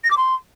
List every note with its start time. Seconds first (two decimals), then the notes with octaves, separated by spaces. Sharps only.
0.04 A#6
0.11 D6
0.17 C6